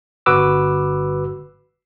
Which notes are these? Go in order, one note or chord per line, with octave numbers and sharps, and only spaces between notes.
G1 F#4 B4 D6 E6